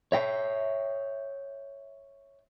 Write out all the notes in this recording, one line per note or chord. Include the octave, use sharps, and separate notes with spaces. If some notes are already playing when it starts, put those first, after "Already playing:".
C#5 E5 G5